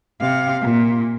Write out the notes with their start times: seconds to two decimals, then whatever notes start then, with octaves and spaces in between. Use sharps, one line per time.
0.21 C3 F5
0.62 A#2